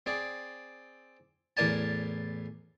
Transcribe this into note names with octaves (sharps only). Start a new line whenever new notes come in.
C4 G#4 D5
E2 A2 A#4 D5 G#5 A5